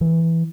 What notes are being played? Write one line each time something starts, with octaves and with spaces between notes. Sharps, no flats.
E3